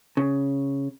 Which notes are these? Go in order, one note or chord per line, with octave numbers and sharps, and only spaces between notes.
C#3